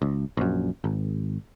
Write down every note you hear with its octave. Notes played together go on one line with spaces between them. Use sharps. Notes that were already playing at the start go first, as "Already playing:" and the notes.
C#2
A#1 F#2
G#1